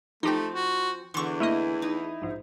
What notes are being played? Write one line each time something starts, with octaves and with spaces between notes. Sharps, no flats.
F3 A3 C4 D#4 G4 G5
F#4
E2 D3 E3 C6 C#6
A3 A#3 E4 D#5 D#7
D#4
A#1 G#2